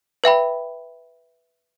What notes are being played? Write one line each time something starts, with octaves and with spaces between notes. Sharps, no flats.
B4 E5 G5 B5